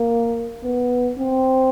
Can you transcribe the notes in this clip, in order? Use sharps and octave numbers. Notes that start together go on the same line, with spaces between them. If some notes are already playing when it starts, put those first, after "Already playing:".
Already playing: A#3
B3
C4